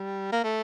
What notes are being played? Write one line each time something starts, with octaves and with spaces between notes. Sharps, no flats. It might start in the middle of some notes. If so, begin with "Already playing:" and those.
Already playing: G3
A#3
A3